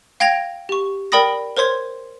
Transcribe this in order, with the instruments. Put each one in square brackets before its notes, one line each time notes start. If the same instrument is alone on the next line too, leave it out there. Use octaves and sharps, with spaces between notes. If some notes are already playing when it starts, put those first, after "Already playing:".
[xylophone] F5 G5 G#6 A#6 F7
G4 C#6
A#4 D5 G5 B5 D#6 A#6
A#4 C5 C#5 C6 G#6